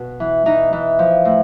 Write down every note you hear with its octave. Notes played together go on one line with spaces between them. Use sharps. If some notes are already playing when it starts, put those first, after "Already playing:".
Already playing: B2
E3
E3 D#4
E3
F3
A2